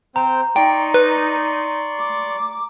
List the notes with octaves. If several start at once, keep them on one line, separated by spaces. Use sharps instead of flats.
C4 C5 G5 A#5
D#4 D5 G5 C6 C#6
B4
D6